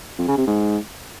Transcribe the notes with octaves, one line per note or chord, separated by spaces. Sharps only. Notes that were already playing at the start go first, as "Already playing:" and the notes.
F2
C#3
C3
G#2